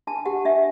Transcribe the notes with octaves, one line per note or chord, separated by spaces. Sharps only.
D4 A5
G4 F#5
D4 E5